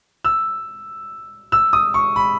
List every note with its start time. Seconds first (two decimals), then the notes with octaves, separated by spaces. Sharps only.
0.24 E6
1.52 E6
1.73 D#6
1.94 C#6
2.16 B5